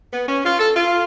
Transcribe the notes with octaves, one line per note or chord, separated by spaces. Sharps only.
B3
C#4
F4
A4
F4